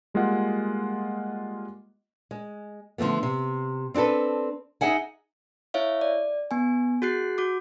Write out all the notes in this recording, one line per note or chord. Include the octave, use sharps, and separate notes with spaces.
G3 G#3 A#3 F4 D#5 F#5
G#3
D3 F3 F#3 A3 B3
C3
C4 D4 G4 A4 B4
D#4 G#4 E5 F#5 G#5
E4 C#5 E5 F5
D5
B3 G#5
F#4 G#4 F#6 C7
F#4 D6